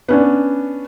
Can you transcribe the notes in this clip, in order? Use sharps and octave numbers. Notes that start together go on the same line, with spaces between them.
B3 C#4 D4